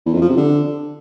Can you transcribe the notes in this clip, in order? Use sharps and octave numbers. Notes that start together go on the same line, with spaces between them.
E2
F2
F3
C3
D3